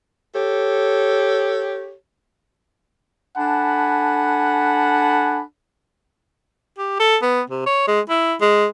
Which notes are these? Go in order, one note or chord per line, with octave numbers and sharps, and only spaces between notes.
G4 A4 C#5
D4 A4 F#5 G#5 A5 B5
G4
A4
B3
C3
C#5
G#3
E4
G#3